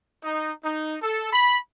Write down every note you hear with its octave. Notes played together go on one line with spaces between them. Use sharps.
D#4
D#4
A4
B5